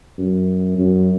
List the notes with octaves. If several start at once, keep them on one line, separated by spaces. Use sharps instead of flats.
F#2
F#2